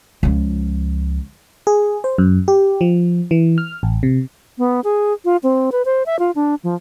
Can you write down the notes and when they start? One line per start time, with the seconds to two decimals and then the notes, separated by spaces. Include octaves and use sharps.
0.23 C#2 F3
1.67 G#4
2.04 C5
2.18 F#2
2.48 G4
2.81 F3
3.31 E3
3.58 F6
3.83 A1
4.03 C3
4.58 B3
4.84 G#4
5.25 F4
5.43 C4
5.72 B4
5.85 C5
6.06 E5
6.19 F4
6.35 D4
6.64 F3